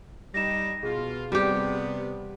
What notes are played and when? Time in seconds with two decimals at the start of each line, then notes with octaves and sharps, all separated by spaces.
0.34 G3 D#4 A#6 E7
0.83 B2 F4 G#4
1.32 C3 G3 B3 G4